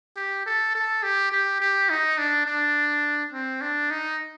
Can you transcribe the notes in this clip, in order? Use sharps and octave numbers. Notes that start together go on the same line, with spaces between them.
G4
A4
A4
G4
G4
G4
D#4
D4
D4
C4
D4
D#4